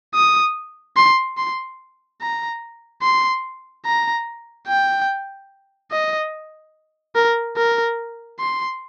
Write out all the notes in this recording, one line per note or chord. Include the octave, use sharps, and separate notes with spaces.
D#6
C6
C6
A#5
C6
A#5
G5
D#5
A#4
A#4
C6